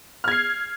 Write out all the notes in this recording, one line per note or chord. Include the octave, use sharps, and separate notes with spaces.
F6 G#6 C7